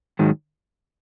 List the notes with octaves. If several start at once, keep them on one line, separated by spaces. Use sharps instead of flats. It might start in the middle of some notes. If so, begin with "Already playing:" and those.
G#2 D#3 F#3